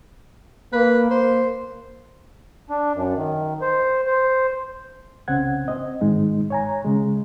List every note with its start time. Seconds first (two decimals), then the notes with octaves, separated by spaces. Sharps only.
0.73 A#3 B4
1.11 A#3 C5
2.70 D4
2.95 F#2
3.17 D#3
3.62 C5
4.07 C5
5.28 C2 C#3 C4 C#4 F#5 G#6
5.68 C4 D#5
6.01 G#2 D#3 G#3 D#4
6.50 C#5 G#5 A#5
6.84 C#3 G#3